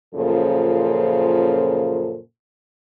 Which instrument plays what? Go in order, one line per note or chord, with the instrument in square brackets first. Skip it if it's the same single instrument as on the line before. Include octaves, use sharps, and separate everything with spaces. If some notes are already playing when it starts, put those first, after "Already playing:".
[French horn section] F#2 A#2 C#3 F3 A4 C5